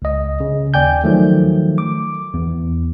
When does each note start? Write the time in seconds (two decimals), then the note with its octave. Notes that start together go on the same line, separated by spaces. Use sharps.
0.02 C#2 D#5
0.40 C#3
0.74 D#2 D5 G5 G#5 G6
1.04 D#3 F3 F#3 A3
1.78 D6
2.34 E2